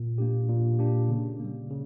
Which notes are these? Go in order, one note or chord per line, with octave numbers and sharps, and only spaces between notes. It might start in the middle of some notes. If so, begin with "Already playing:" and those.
Already playing: A#2
A#3 D4 G4
A#2
A#3 D4 G4
C#3
G3 A#3
C#3